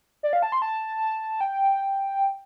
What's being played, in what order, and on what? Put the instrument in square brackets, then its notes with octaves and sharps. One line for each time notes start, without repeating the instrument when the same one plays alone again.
[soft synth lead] D5
F5
A5
C6
A5
G5